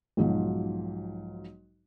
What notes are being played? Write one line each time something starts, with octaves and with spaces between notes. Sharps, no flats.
B1 G#2 F3 F#3